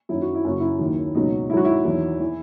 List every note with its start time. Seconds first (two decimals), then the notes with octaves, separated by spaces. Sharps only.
0.09 F#2 D#3 F#3 E4
0.22 F#4
0.35 E4
0.45 F#2 C#3 F#3 F#4
0.60 E4
0.79 D#2 D#3 F#3
1.15 C#2 B2 F#3 D#4
1.50 G#2 E4
1.52 D#3 F#3 F#4
1.65 E4
1.85 E2 D#3 F#3
2.20 E3